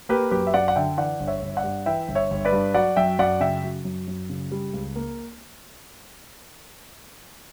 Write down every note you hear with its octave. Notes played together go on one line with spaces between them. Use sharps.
A#3 G4 B4
F#2 G4 B4
E5
F#2 D5 F#5
F#5
D3 E5 G5
E3 D5 F#5
G1
C#5 E5
G1
D5 F#5
G2
E3 E5 G5
G1
C#5 E5
G1
B4 D5
G2
F#3 D5 F#5
F#2 E5 G5
F#2 D5 F#5
C#3 E5 G5
F#3
F#2
F#2
C#3
G3
C#2
A#3